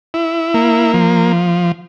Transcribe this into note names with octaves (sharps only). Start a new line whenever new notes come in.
E4
A#3
F3